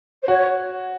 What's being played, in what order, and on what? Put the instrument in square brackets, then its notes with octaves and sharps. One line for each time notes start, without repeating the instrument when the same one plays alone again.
[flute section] C5
[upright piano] F#4 [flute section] C#5